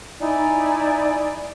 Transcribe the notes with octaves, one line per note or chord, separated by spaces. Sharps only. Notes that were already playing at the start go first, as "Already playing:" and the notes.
D#4 E4 D5 G#5